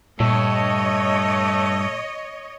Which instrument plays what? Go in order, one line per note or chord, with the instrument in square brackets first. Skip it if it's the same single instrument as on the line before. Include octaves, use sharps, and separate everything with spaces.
[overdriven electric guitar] G2 [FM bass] A#2 [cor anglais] A3 [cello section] C#5 D#5